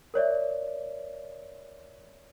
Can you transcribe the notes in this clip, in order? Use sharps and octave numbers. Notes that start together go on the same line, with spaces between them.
A#4 C#5 D5 E5